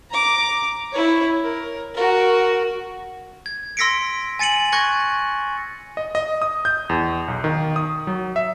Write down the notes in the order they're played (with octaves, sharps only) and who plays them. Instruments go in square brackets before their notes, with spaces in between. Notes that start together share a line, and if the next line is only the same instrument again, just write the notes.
[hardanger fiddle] A#5 D6
E4 C#5
A#4
F#4 A#4
[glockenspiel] G#6
C6 E6 A#6 B6 C#7 D7
G#5 A6 C#7 D#7 F#7
C#6 F#6 G#6 A#6 C#7
[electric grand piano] D#5
D#5
D#6
G6
E2
B1
D#3
D#6
F#3
E5